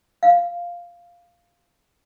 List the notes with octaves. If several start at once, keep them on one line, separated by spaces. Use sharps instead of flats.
F5